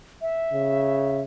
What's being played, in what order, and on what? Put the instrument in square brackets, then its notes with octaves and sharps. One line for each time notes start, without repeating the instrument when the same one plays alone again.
[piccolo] E5
[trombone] C#3